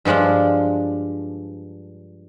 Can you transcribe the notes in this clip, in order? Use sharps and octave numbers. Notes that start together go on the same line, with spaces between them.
G2 F3 G#3 D4 F4